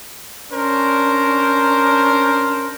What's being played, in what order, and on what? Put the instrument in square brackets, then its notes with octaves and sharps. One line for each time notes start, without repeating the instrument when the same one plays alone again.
[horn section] C#4 D4 A#4 C5